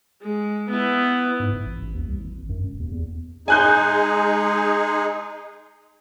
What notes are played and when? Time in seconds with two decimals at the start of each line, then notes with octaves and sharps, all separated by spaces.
0.22 G#3
0.70 B3 E4
1.40 G#2
1.53 F1
1.66 A1
1.80 A1
1.95 D#2
2.08 C2
2.20 G#1
2.32 G#1
2.49 F#2
2.61 E1
2.80 D#2
2.92 E2
3.48 G#3 D#4 G#4 G#5 F#6 G6